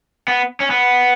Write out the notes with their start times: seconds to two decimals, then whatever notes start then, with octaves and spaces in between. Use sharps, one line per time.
0.28 B3
0.60 C#4
0.70 B3